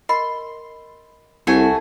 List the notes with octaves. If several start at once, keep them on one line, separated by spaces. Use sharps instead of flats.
A#4 D#5 B5 C6
C2 A3 F#4 G4 F#5 G#5